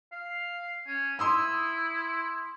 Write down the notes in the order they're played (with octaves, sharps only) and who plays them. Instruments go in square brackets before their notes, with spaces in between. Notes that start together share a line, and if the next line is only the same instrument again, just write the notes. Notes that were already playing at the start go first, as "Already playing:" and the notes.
[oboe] F5
C#4
[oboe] E4 [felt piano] C6 D#6 E6